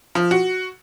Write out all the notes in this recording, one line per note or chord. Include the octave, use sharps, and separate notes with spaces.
F3
F#4